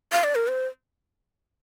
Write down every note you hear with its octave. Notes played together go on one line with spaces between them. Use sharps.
F5
D5
A#4
C5